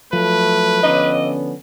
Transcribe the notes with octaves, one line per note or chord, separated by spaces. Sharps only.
F3 F#3 A3 B4
D3 B3 C#4 D#5